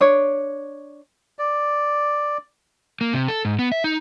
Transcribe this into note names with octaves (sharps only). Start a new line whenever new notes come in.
D4 C#5
D5
A#3
C3
A4
G#2
B3
E5
D#4